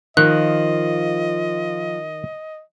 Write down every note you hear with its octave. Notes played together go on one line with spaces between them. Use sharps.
D#3 F3 D#5 F#6